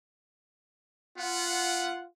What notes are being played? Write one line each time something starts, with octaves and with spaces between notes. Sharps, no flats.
B3 F4 F#5